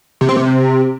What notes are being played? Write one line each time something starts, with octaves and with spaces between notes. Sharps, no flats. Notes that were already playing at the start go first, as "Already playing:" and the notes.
C3
C4
C3